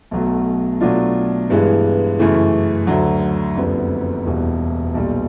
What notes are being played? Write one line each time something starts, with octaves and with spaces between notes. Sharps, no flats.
B1 B2 F#3 A3
B2 F#3 A3 D4 F4
G2 E3 G#3 B3
F#2 C#3 E3 A3
D2 D3 F#3
F#1 F2 D3 G3 B3
E1 E2 B2 G3
B1 A#2 G3